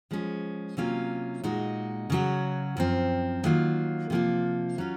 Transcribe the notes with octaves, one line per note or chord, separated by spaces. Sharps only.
F3 G#3 C#4
C3 F#3 A#3 C#4 F4
A#2 G#3 D#4 F#4
C#3 F#3 C#4 F#4
F#2 F3 C4
D#3 F#3 A#3 F4
C3 F3 A#3 F4
F#3 C#4 F4